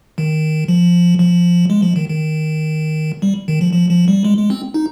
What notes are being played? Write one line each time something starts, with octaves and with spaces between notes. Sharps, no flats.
D#3
F3
F3
G#3
F3
D#3
D#3
G3
D#3
F3
F3
F3
G3
G#3
G#3
C4
D#4